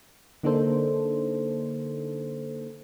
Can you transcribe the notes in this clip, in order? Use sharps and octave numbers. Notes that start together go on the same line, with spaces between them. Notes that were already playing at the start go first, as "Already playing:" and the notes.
D3 A#3 D4 D#4 A4 C5